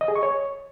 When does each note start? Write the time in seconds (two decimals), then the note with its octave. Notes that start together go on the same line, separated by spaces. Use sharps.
0.01 D#5
0.08 G#4
0.16 C#6
0.23 C#5